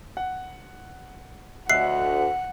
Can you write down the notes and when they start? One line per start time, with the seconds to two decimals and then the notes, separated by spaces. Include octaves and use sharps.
0.17 F#5
1.70 D2 D#5 E5 F#5 F#6 C7